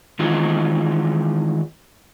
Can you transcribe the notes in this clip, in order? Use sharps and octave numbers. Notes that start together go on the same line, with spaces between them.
D#3 E3 G#3 C4 D#4 F4